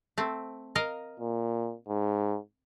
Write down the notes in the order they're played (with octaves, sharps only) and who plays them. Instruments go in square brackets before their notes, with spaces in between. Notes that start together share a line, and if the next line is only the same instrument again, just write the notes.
[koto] A3 C4
A#4 D#5 F5
[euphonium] A#2
G#2